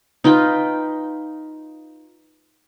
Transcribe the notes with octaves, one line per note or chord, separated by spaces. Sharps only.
D#4 F4 B4 G5